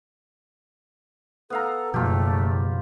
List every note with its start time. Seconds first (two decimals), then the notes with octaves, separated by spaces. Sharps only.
1.50 B3 A4 F5 A#5
1.94 F#1 B2 F3 A3 F4 G4